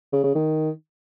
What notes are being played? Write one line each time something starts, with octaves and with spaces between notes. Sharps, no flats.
C#3
C#3
D#3